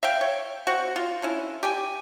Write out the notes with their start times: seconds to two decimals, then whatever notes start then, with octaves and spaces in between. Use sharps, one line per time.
0.03 E5 F5 G5
0.21 C#5
0.67 C4 F#4 F#5
0.96 F4
1.22 D3 C#4 E4
1.63 G4 G5 G#5